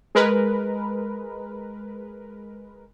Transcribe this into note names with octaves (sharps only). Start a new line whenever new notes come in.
G#3 A#4 B4